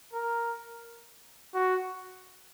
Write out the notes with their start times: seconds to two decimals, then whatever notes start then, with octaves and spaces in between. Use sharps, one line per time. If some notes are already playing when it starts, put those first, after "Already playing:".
0.14 A#4
1.54 F#4